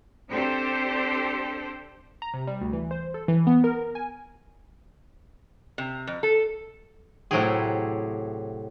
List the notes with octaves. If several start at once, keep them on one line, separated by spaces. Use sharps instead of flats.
C4 D4 G4 A4 C5
A#5
C3
G3
D2
E3
C5
A4
E3
B3
A#4
G#5
C3
F2
A4
A2 C3 F#3 E4 G4 G#4